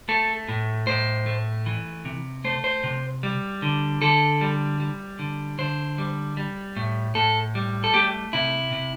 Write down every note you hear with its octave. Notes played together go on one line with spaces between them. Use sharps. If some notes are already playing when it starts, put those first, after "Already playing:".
A3 A4
A2
A2 C5
A3
E3
C3
A3 C5
C5
C3
G3
D3
D3 A4
G3
G3
D3
D3 C5
G3
G3
A2
A2 A4
G3
A4
A3 G4
C3 E4
C3